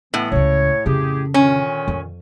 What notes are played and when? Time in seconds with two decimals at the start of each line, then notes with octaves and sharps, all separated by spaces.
0.14 A2 E3 B3
0.32 C#2 C#3 C#5
0.86 F2 C#3 G4 G#4
1.34 A#2 D3 D#3 C#4
1.88 F2